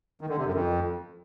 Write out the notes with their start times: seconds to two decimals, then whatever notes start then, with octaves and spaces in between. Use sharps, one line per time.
0.21 D#3
0.29 D3
0.37 C3
0.46 F#2
0.54 F2